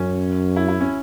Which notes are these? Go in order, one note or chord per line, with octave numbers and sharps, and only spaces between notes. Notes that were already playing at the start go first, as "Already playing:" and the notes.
Already playing: F#2 C#4
E4
E4
C#4